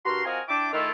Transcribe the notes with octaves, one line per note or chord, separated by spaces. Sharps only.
G2 F#4 A#4 A#5 C6
C4 F4 F#4 A#4 D#5 G#5
D4 E4 E5 G5 A5 D6
D#3 A3 E4 F4